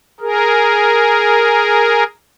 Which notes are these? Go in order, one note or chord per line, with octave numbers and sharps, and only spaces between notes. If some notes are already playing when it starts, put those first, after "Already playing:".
G#4 A#4